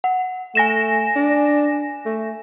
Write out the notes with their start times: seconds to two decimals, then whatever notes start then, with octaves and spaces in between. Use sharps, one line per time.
0.04 F#5
0.55 A3 G#5 A#6 E7
1.16 D4
2.06 A3